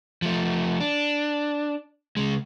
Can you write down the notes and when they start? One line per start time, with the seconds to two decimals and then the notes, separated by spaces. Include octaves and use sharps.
0.22 F3 A3
0.80 D4
2.17 C#3 G#3